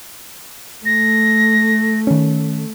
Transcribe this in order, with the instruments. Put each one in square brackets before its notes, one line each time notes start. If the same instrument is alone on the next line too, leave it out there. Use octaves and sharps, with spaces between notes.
[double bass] A3 [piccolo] A#6
[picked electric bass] D#3 C#4